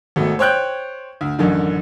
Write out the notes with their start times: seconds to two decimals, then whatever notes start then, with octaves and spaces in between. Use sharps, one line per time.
0.16 G#1 B2 A3
0.39 C5 C#5 G5 F#6 G6
1.21 D2
1.39 A1 F#2 D3 D#3